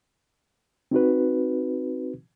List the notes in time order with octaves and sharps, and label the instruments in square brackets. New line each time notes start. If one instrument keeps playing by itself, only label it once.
[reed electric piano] C4 D#4 F#4 B4